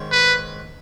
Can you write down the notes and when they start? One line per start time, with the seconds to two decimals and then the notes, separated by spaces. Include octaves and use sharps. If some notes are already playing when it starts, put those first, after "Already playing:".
Already playing: G#2 D#3 G#3 C#4
0.12 B4